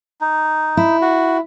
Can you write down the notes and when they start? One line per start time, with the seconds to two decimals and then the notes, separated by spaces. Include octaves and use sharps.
0.21 D#4
0.77 E4
1.02 F#4